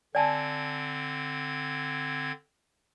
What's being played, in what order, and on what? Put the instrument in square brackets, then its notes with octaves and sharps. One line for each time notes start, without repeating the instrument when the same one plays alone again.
[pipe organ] D3 C4 G#6 [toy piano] D5 G#5 A5